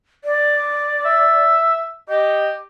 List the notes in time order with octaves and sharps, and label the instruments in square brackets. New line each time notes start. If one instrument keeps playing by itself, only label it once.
[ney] D5
[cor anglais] E5
[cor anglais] G4 [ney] D#5